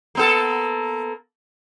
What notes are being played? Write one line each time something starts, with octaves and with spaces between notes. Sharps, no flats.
A#3 B3 A4